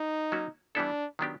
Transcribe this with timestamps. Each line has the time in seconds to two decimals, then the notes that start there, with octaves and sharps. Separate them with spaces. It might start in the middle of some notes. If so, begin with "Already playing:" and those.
Already playing: D#4
0.32 F#3 A#3 C#4 F#4
0.75 E3 G3 B3 D4 E4 A4
1.19 D#3 F#3 B3 D4 G4